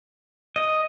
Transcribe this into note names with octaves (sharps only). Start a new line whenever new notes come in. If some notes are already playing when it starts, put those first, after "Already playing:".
D#5